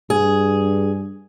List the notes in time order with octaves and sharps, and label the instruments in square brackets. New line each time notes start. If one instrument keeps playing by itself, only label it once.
[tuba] G2 [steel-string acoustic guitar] G#4